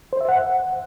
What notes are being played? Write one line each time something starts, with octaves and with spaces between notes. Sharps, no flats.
C5
E5
F#5